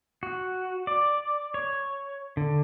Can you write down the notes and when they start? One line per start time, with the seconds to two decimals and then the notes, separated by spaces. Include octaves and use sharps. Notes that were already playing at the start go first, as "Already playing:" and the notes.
0.23 F#4
0.87 D5
1.54 C#5
2.37 D3